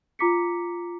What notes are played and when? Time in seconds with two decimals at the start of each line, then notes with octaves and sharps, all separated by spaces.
0.19 F4 A#5 D6 B6 C#7